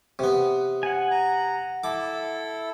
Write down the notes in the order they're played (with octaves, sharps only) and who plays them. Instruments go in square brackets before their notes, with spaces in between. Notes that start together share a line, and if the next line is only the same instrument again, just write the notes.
[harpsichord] C3 B3
[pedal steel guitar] F#5 G#5
[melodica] A#5
[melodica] E4 A4 [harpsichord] D6